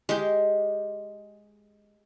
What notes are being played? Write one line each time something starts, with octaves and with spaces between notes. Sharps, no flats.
G#3 G4